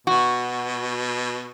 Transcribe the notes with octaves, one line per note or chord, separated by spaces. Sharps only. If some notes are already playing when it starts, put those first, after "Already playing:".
B2 F#4